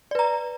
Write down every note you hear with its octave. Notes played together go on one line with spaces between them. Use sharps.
B4 D5 A#5